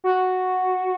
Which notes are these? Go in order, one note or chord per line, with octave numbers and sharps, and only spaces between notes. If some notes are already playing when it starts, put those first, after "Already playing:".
F#4